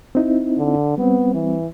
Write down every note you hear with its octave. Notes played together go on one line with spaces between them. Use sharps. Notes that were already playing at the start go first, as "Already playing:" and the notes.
C4 D#4 E4
D3
G3 B3 C4
E3